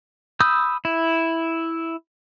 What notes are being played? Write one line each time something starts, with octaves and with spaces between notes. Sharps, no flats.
B5 D#6 E6 G6
E4